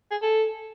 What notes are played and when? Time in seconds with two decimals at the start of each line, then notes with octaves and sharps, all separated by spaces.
0.11 G#4
0.22 A4